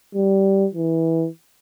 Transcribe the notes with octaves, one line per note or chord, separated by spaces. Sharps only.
G3
E3